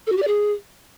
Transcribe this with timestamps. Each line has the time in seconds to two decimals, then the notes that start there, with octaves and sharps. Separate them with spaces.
0.07 A4
0.12 F#4
0.17 G4
0.22 D5
0.27 G#4